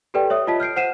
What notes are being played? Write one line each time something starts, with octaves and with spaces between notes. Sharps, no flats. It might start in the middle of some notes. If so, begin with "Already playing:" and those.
G4 A4 B4 D5 G5
C#5 E5 D#6
F4 D#5 A5 B6
F6 G6 C7 D7
C5 F#5 C7 D#7 E7